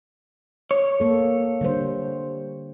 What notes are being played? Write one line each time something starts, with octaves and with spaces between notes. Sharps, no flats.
C#5
A#3 A4
D3 G3 C5